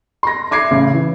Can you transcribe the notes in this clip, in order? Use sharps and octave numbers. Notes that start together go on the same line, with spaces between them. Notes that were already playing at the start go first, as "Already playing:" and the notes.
C6 A#6
E5 D6 G#6 C7
A1 C#3
E3